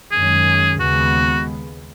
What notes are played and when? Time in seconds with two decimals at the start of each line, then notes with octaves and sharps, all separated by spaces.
0.11 F#2 D#3 G#3 C#4 G#4
0.80 D#2 C#3 G#3 B3 F#4